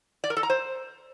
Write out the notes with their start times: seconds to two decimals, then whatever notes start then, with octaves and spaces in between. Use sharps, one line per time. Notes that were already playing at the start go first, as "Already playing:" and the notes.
0.24 D5
0.30 A#4
0.37 A4
0.43 A#5
0.50 C5